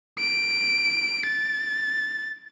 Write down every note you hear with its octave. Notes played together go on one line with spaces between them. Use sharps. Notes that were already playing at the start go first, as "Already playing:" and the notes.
D7
A6